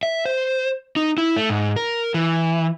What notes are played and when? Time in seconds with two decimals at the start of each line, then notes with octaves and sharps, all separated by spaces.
0.03 E5
0.25 C5
0.96 D#4
1.18 E4
1.37 A3
1.50 G#2
1.76 A#4
2.14 E3